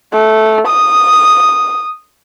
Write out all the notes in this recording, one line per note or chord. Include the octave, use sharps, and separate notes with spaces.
A3
D#6